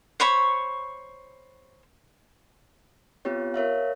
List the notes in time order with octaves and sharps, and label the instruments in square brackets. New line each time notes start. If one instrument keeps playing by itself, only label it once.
[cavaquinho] C5 C#5 B5 C#6
[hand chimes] B3 C4 F4 G4 C#5
A#4 C#5 E5 F5